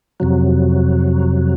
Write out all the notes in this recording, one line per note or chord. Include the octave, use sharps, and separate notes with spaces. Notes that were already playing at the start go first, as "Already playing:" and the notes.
F2 C3 F#3